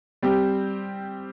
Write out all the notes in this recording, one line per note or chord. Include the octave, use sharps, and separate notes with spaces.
G3 C4 G4